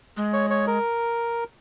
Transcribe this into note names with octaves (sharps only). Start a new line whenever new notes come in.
G#3
C#5
C#5
A#4